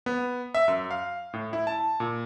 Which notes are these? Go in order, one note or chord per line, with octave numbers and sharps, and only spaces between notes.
B3
E5
F#2
F5
A2
E4
A5
A#2